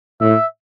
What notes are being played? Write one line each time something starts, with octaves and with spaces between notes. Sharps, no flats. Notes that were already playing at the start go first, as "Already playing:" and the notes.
A2 E5